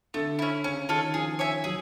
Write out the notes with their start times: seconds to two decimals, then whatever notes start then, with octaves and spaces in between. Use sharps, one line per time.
0.14 D3 A3
0.39 C#4 E4
0.64 C#3 C#4
0.89 D#3 F4 A4 C#5
1.14 F3 G#4
1.39 C#5 E5 G#5
1.64 F#3 G#4